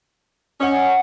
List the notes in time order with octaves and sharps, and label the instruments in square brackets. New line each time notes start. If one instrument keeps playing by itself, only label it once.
[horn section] C#4 [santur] D#5 F#5